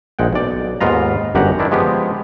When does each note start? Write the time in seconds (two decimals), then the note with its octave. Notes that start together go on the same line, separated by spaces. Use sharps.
0.19 A#1 G#3 F#5 G5
0.33 B1 D5
0.81 D#2 G#2 B3 F4 A#5
1.35 G1 F#2 G4 F#5 A#5
1.59 D#3 D4 E4
1.71 F3 G#3 B3 G4